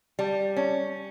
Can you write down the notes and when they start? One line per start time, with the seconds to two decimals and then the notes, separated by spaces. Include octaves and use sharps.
0.19 G3
0.56 C#4